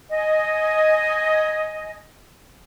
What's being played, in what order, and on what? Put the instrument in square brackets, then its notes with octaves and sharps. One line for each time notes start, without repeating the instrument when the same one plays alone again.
[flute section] D#5 G#5